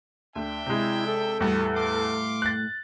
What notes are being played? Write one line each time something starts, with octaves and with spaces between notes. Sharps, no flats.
D2 D4 E5 G5
C3 G#3 E4
A4
E2 A2 G3 A3 B3 F#4
F5 C6 D6
F#6 A6